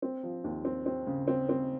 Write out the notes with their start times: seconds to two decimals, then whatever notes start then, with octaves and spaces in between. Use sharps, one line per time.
0.02 C4
0.23 F3
0.44 D#2
0.65 C4
0.86 C4
1.07 C#3
1.27 C4
1.49 C4